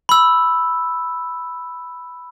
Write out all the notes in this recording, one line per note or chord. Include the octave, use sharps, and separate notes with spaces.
B5 E6